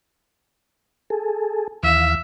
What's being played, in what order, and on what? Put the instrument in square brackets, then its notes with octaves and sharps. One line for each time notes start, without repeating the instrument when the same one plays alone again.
[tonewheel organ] G#4 A4
[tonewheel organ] D#2 E3 F5 [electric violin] E5